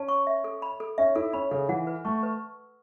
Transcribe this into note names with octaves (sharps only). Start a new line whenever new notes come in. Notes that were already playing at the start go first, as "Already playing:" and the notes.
Already playing: C#4 A5
C#6
E5
A4
B5
A4
C#4 E5
E4 A4
C#4 B5
C#3 A4
E3 F#5
B4
A3 C#6
B4